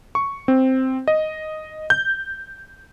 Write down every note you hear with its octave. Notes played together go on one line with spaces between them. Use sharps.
C#6
C4
D#5
G6